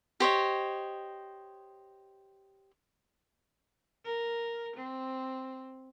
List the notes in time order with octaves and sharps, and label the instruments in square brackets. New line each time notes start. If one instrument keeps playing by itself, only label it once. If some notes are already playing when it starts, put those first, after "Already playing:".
[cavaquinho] G4 C5 C#5 D#5
[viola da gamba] A#4
C4